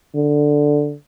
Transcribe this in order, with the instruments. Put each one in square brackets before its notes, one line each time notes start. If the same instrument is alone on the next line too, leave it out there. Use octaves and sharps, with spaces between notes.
[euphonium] D3